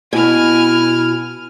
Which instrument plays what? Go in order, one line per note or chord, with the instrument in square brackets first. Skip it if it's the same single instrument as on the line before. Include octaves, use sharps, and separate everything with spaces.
[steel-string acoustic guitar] B2 [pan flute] E4 [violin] G#5 F6